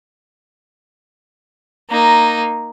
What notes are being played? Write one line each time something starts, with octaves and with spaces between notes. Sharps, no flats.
A#3 D#4